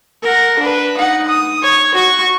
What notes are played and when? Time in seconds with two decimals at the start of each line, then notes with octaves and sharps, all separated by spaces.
0.23 A#4 F#5
0.59 D4 B4
0.97 D#4 F#5
1.28 D#6
1.62 C#5
1.95 F#4 C#6